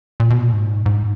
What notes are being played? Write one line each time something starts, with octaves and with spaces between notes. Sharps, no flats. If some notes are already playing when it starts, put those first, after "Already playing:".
A#2
B2
A#2
G#2
G#2